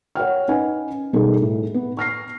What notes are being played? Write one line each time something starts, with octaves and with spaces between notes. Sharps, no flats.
C#5 F#5 G5 F6
C#4 D#4 B4 D#5 F#5 G#5
B2 D#3 G3 G#4 A4
A2
B3
C#6 F6 A#6 C7